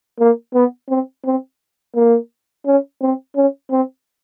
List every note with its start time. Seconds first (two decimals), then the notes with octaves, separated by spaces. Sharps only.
0.20 A#3
0.54 B3
0.89 C4
1.25 C4
1.95 A#3
2.66 C#4
3.01 C4
3.36 C#4
3.71 C4